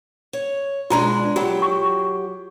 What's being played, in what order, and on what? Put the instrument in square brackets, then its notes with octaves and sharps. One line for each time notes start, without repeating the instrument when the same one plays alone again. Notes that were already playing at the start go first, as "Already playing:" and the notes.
[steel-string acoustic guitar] C#5
[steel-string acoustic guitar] B2 G#3 D4 [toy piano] F4 A#5
[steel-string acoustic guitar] F#3 G4 [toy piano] F4
[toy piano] C#6